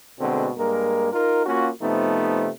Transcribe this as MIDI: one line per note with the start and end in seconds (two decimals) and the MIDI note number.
0.20 0.50 47
0.20 0.50 50
0.20 0.50 56
0.20 0.50 57
0.20 0.50 60
0.58 1.11 43
0.58 1.11 56
0.58 1.11 58
0.58 1.11 70
1.13 1.44 63
1.13 1.44 65
1.13 1.44 70
1.46 1.70 58
1.46 1.70 61
1.46 1.70 65
1.46 1.70 66
1.82 2.49 48
1.82 2.49 53
1.82 2.49 57
1.82 2.49 59
1.82 2.49 63